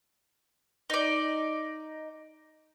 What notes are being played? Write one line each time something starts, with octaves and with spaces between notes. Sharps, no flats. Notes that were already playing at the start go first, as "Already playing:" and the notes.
D#4 D5